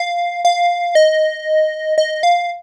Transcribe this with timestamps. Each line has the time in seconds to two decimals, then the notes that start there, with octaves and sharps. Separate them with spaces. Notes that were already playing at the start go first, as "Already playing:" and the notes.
Already playing: F5
0.45 F5
0.95 D#5
1.98 D#5
2.23 F5